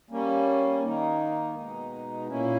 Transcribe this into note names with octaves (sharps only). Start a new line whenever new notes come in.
G3 A#3 C#4
D#3 A#3 D#4
B2 G#3 D#4
A#2 A#3 C#4 E4